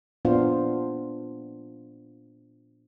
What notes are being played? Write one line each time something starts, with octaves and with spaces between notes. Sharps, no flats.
A#2 B3 D4 F4 C5 F5